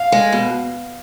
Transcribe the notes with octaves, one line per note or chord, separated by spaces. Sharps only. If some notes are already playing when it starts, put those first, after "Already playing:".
Already playing: F5
G#3
B2